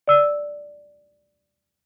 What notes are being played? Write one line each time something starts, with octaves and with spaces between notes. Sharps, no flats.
D5 E6